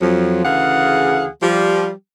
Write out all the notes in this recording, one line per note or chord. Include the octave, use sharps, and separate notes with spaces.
F2 F3 F#3
D2 C#3 E3 G#4 F5 F#5
F3 G3 G4